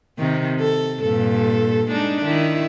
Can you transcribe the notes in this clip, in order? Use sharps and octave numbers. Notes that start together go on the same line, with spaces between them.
C3 D#3
A4
G2 A#2 A4
G#3 D4 D#4
D#3 E4